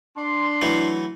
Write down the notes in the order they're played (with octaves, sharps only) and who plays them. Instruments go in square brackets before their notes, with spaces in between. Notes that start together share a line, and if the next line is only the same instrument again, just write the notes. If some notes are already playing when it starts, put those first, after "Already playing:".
[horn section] D4 C6
[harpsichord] E3 F#3 A3